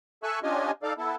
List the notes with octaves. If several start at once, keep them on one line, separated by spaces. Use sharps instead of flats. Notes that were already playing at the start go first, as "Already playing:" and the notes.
A4 E5 G#5 C#6 E6 F#6
C#4 D4 F4 G4 D#5 G#5
D#4 A4 D5 F5
B3 E4 A4